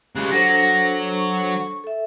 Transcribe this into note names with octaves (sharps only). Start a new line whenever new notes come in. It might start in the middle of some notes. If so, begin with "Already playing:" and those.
C#3 G#3 G4 F#6
F#3 D4 F#4 A4 C5 A#6
C#6
A4 E5